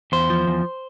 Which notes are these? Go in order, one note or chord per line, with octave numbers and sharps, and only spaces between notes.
E2 C5
F3
E2